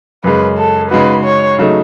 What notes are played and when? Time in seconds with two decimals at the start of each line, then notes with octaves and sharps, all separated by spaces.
0.24 F#2 C#3 G#3 B4
0.58 A4
0.90 C#3 G#3 D#4 F#4 B4
1.24 C#5
1.58 C#3 F#3 A3 D#4